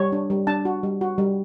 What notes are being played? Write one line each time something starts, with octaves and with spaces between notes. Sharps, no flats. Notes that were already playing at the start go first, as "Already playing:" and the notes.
Already playing: G3 C#5
D4
G3
D4 A5
F#4
G3
F#4
G3